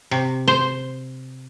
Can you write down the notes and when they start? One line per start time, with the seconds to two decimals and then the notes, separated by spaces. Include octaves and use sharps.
0.11 C3
0.48 C5